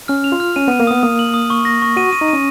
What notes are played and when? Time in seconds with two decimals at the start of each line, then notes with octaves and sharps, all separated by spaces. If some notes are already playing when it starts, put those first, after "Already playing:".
0.08 C#4 F6
0.24 F7
0.32 F4
0.40 F6
0.56 C#4 D#7
0.68 B3 D#7
0.80 A#3
0.87 B3 D#6
1.03 A#3 D#6
1.19 F#7
1.34 D#6
1.50 C#6
1.65 A#6
1.82 C#6
1.97 F#4 D#7
2.13 D#7
2.21 D#4
2.28 C#4 D#7